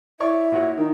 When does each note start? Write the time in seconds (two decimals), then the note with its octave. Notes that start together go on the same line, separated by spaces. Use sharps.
0.20 E4 C#5 D5 E5 C#6
0.52 A#2 F#4 C#5
0.77 D#3 D#4